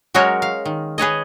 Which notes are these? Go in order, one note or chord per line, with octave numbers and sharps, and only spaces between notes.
F#3 G#3 C#4 F#4 A#4 C#5
F5
D#3
G#4 B4 C#5 D#5